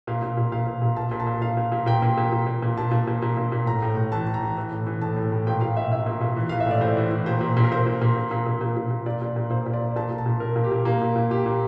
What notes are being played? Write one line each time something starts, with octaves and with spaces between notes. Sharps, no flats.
A#2 F5
A#2
A#2
A#2 F5
A#2
A#2
A#2 A5
A#2
A5
A#2
A#2 F5
A#2
A#2
A#2 G5
A#2
A#2
A#2
A#2
A#2
A#2 A5
A#2
A#2
A#2
A#2
A#2
A2 A#5
A2
A2
E3 A5
E3
A#5
E3
E3
A2
E3
A2 A5
A2
A2
A#2 G5
A#2 F5
A#2 E5
A#2 E5
A#2
A#2
E3
E3 F5
E5
A2
D5
A2 C5
E3
E3
A#2 C5
A#2
A#2
A#4
A#2 C5
A#2
A#2
A#2
A#2
A#2
A#2
A#2
A#2
A#2 D5
A#2
A#2
A#2 C5
A#2
D5
A#2
A#2 A5
A#2
A5
A#2
A#2 A#4
A#2
G4
A#2
A#2 A#3
A#2
A#2
A#2 G4
A#2